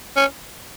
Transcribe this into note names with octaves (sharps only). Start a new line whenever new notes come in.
C#4